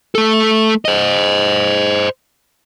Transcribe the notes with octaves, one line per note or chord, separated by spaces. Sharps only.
A3 A4
C5 D#5